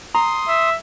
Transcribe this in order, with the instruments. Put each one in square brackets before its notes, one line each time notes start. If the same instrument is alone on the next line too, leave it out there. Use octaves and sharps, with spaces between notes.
[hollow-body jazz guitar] A#5 [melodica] C6 D#6
[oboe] E5